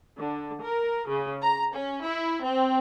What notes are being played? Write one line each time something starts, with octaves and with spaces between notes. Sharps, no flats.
D3
A#4
C#3
A#5
C#4
E4
C4